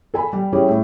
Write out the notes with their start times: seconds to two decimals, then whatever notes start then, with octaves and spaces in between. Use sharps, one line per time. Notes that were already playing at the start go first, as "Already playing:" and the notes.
0.14 A4 G#5 B5
0.33 G3
0.53 G3 C#4 E4 G4 G#4
0.69 A2